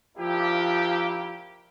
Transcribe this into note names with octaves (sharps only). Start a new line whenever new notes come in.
F3 A#3 D4 E4 F4 G4